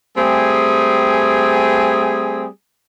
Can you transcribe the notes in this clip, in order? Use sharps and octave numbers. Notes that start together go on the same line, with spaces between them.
G3 A3 C4 G#4